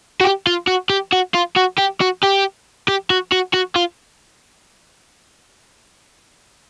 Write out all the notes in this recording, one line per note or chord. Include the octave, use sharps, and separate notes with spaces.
F#4
G4
F4
F#4
G4
F#4
F4
F#4
G4
F#4
G4
G4
F#4
F#4
F#4
F4